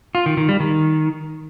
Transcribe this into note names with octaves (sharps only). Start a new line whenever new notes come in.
F4
D#3
D#3
G3
D#3